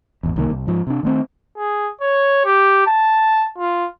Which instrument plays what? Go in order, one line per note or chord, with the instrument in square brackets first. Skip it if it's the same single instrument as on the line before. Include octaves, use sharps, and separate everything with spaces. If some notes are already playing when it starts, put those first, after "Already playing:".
[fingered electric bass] G#1 E2
C2 D#3 F3 A#3
C2
G#2 F3
C3 D4
D#3 A3 C4
[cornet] G#4
C#5
G4
A5
F4